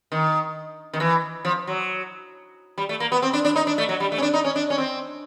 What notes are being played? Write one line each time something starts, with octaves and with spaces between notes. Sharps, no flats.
D#3
D#3
E3
F3
F#3
G3
A3
A#3
B3
C4
D4
D4
D#4
D4
A3
F#3
G3
A3
C#4
D4
D#4
C#4
D4
C#4
C4